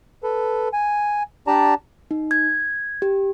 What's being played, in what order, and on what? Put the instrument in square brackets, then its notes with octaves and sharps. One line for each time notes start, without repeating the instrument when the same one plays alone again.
[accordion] A4 B4
G#5
D4 G4 D5 A5 A#5
[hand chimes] D#4
G#6
G4